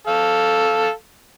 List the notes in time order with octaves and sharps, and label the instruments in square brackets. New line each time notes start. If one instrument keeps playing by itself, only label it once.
[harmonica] A4 F5